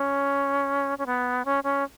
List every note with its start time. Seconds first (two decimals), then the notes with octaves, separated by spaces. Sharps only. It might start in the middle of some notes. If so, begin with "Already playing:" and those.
Already playing: C#4
0.98 C#4
1.06 B3
1.45 C#4
1.64 C#4